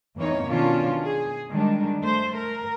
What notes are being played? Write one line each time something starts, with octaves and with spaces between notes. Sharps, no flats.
E2 E3 A#3 C4 D#4 C#5
B2 D#3 C#4 D4 F4
G#4
D#3 G3 G#3 D4
A3 C5
A#4